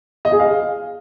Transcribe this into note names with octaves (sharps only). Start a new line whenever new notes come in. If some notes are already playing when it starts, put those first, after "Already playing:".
D#5
G#4
F5